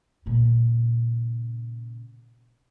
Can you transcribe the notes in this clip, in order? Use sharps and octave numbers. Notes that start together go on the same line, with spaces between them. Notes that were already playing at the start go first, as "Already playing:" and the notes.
A#2 C#3